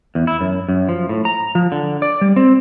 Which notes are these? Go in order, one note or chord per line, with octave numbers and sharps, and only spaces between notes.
E2
E4
F#2
F#2
F3
A2
A#5
F3
D3
D5
G3
C4